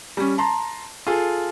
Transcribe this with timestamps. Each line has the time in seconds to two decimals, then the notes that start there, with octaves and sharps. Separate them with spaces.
0.17 G3 C#4
0.38 A5 A#5 C6
1.07 F4 G#4 A4